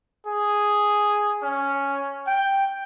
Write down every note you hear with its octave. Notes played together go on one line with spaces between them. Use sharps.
G#4
C#4
G5